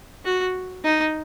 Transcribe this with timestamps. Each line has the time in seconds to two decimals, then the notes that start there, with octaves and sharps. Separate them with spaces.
0.25 F#4
0.84 D#4